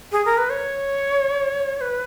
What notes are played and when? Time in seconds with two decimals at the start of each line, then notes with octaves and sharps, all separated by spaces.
0.12 G#4
0.25 A#4
0.38 B4
0.50 C#5
1.76 C#5
1.81 B4